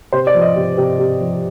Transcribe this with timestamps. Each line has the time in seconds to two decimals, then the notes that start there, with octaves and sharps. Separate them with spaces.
0.12 C3 C5
0.27 D5
0.35 F3
0.41 D#5
0.56 C3
0.77 C3
0.99 C3
1.20 F3